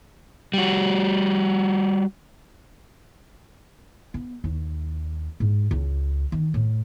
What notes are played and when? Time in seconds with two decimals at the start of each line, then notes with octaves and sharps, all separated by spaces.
0.54 G3 F#4
4.14 B3
4.44 D#2
5.40 G#2
5.71 C#2
6.32 D#3
6.54 A2